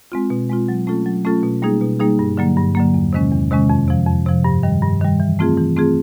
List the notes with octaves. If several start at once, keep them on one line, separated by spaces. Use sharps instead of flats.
G#3 C4 F4
B2
G#3 C4 F4
F#3
A3 C#4 F4 A4
F#3
A3 C#4 F4 A4
B2
G3 A#3 D#4 G#4
B2
G3 A#3 D#4 G#4
G2
D3 F#3 A#3
G2
D3 F#3 A#3
E2
C3 D#3 G#3 C#4
E2
C3 D#3 G#3 C#4
F2
C3 F3
F2
C3 F3
G2
D#3 G3
G2
D#3 G3
E3
A3 C4 F4 G#4
E3
A3 C4 F4 G#4